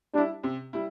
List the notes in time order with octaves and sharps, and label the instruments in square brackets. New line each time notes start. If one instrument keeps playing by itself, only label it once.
[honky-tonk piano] G3 E4 [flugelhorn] D4
[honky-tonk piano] C3
G3 E4